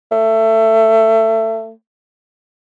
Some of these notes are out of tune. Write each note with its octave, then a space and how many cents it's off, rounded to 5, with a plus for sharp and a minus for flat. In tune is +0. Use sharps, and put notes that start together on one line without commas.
A3 +20